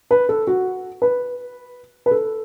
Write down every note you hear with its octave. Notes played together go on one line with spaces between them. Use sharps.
B4
A4
F#4
B4
B4
A4